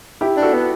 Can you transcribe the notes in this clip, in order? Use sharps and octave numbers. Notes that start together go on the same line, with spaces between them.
E4 G4
D4
F#4 A4
B3